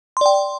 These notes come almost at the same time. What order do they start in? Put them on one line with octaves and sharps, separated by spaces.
C6 D5 G5